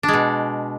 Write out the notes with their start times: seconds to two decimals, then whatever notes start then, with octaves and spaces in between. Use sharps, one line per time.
0.03 D4
0.08 G#3
0.13 B2